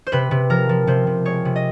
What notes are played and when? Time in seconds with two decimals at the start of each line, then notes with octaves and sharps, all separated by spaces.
0.07 C5
0.12 C3 B4
0.31 C3
0.50 F3 A#4
0.69 F3
0.87 C3 C5
1.07 C3
1.25 G#3 C#5
1.45 C3
1.56 D#5